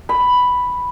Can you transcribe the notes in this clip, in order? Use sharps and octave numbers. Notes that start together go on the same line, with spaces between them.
B5